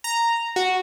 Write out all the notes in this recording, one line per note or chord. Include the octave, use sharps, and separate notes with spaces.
A#5
F#4